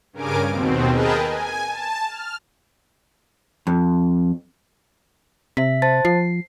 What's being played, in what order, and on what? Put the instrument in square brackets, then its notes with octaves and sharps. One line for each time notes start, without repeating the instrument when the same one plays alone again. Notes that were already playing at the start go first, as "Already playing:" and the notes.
[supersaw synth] G2 C#3 A#4 G#5 D6 D7
D#2 B2 C4
G#4 A#4 B4 D#5 G5 A5
G#5
A5
F6
[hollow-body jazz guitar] F2
[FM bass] C3 [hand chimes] E5 B6
[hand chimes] C5 A5 A6
[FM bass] F3 [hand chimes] C7